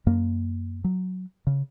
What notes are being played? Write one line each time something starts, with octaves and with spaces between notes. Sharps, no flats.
F#2 A#3
F#3
C#3